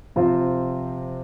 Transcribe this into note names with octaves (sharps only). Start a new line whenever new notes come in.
C3 F3 C4 F4 C5